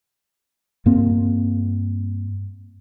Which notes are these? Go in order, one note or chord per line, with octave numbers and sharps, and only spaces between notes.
G2 A#3 C4